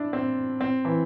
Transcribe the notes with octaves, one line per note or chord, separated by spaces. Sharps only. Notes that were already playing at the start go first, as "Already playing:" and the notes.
Already playing: D4 E4
C4
C4
E3